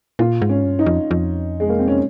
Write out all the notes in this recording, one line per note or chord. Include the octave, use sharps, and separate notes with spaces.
A#2 F4
G#2
C#4
G2
D#4
F2
F2
G#3
A#3
C4
C#4